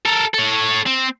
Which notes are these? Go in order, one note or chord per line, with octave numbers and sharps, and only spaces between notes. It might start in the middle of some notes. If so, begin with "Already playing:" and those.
A4 A#4
A4 C#5
C4